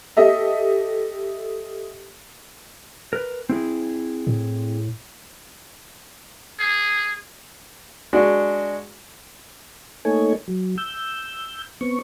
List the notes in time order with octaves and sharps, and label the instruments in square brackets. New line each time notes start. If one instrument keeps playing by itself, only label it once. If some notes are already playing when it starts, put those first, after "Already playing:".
[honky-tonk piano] G4 A4 D#5 E5
[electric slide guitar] A#4 B4
C4 E4 G#4
[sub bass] A2
[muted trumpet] G#4
[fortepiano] G#3 D4 F#4
[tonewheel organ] A3 A#3 D#4 A4 C#5 G#5
F#3
E6 G6
B3 C4 C#6